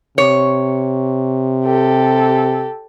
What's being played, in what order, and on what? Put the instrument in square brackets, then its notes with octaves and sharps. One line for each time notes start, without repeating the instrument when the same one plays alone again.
[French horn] C3 [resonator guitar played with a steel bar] C#5
[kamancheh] G4 A4